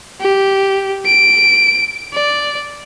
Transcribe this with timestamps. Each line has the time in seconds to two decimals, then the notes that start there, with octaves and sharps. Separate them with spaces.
0.20 G4
1.06 D7
2.13 D5